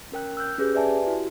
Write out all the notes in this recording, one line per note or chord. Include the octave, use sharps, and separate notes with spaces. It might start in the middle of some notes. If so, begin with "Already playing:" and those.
C#4 A#4 G5 F#6
E6 F#6 G6
C#4 G4 G#4 B4
B4 D5 E5 G#5 A5
G4
E4 F#4